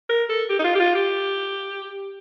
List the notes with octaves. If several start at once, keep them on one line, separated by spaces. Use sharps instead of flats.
A#4
A4
G4
D#4
F4
G4
F4
G4